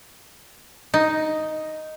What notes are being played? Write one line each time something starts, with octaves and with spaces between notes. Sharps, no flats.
D#4